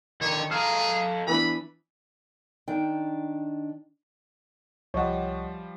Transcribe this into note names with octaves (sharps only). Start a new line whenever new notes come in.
D3 D#3 C#5
G#4 A4 F5 A#5 F6
E3 B3 D4 B5
D#3 D4 G5
C2 F3 G3 C#5 D#5 F#5